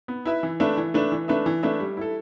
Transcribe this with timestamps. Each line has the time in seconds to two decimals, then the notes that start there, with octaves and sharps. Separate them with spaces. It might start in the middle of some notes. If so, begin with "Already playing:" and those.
0.08 B3
0.26 E4 B4 E5
0.43 E3
0.60 A3 D4 B4 E5
0.77 E3
0.94 A3 D4 B4 E5
1.12 E3
1.28 A3 D4 B4 E5
1.46 E3
1.63 A3 D4 B4 E5
1.80 G3
1.97 E4 A4